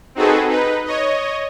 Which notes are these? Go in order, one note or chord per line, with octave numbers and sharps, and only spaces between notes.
C4 D#4 F#4 G#4 A4 B4
D#4 B4
C#5 D#5